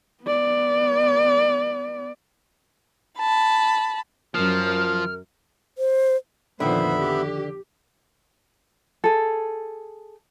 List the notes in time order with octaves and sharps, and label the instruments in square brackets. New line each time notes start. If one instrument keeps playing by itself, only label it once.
[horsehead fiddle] B3 D5
[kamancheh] A5 B5
[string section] F#2 [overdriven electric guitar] F3 [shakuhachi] A#4 [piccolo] F6
[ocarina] C5
[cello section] F2 A#2 C5 [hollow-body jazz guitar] D3 D#3 [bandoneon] B3 E5 B5
[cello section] G4
[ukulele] G#4 A4